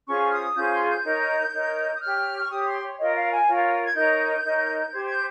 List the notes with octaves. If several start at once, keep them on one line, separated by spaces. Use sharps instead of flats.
C#4 F4 G#4 C5 C#6
F6
D#6
C#4 F4 G#4 C5 G6
C6
G6
D#4 A#4 C#5
D#4 A#4 C#5
D#6
G4 C#5 F6
C#6
G4 C#5 D#6
C6
C#5
F4 A#4 C#5 D#5
F5
G#5
F4 A#4 C#5
G#6
D#4 A#4 C#5 G6
D#4 A#4 C#5
G4 C5 G#6
G#6
G6